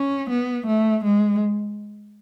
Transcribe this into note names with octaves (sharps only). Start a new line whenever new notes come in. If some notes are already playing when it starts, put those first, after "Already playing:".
Already playing: C#4
B3
A3
G#3